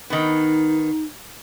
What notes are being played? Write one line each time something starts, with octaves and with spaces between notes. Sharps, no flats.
D#3 B3 D#4